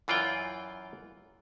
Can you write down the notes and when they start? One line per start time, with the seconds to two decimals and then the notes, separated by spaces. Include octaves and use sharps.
0.08 F#2 E3 F4 D5 G5